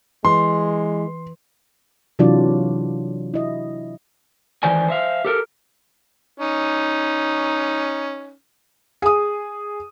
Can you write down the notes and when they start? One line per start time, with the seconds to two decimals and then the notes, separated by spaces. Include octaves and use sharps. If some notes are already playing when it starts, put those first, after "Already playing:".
0.25 E3 G#3 C6
2.19 C3 E3 F#3 D4 F4 D5
3.34 E4 D#5
4.63 D#3 E3 C5 D5 G#5
4.88 C5 E5 F5
5.25 G4 A4 A#4
6.40 C#4 D#4
9.02 G#4 D#6